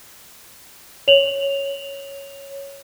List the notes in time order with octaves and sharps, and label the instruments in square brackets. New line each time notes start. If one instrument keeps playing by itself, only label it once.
[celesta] C#5 F7 F#7